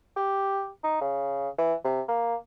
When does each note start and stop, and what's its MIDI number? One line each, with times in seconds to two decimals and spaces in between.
0.17 0.69 67
0.84 0.99 63
1.01 1.49 49
1.58 1.74 52
1.84 2.01 48
2.08 2.35 58